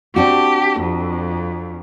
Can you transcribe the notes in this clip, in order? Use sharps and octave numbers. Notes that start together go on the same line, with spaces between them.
C4 D4 F#4 G4
F2